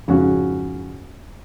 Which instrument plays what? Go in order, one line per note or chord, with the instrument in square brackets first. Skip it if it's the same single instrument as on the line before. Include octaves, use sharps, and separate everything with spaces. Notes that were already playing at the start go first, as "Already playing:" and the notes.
[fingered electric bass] F2 G#2 [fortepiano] C#3 C#4 F#4